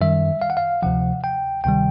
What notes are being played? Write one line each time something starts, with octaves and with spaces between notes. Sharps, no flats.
F#2 D#3 G3 E5
F5
F#5
F5
D2 C3 F3 F#5
G5
D2 C3 D#3 G3 G5